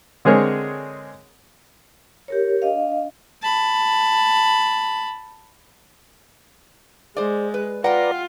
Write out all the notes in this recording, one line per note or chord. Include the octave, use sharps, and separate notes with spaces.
D3 G#3 C4 G#4 A#4 C#5
G4 A#4 C#5
D4 D#5 F5
A5 B5
G#3 C5 D5
B4
F4 B4 D5 F#5 G5 A#5